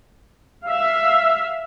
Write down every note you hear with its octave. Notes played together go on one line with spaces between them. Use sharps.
E5 F5